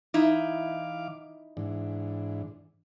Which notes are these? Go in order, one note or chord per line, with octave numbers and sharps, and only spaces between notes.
E3 D#4 E4 F5 D6
G#2 E3 D4